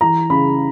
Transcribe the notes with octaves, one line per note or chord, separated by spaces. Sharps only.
E3 A#5
C#3 B5